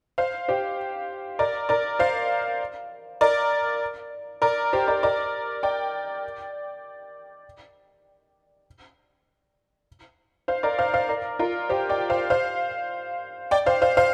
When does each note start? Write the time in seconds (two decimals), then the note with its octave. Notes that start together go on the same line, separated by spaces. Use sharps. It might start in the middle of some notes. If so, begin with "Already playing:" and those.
0.18 C5 F5
0.48 G4 C5
1.39 A#4 D5
1.69 A#4 D5
1.99 C5 F5
3.21 A#4 D5
4.42 A#4 D5
4.73 G4 C5
4.88 A#4 D5
5.03 A#4 D5
5.63 D5 G5
10.48 C5 F5
10.63 A#4 D5
10.79 C5 F5
10.94 C5 F5
11.09 A#4 D5
11.39 F4 A#4
11.69 G4 C5
11.89 D5 G5
12.10 C5 F5
12.30 C5 F5
13.51 D5 G5
13.66 C5 F5
13.82 C5 F5
13.97 C5 F5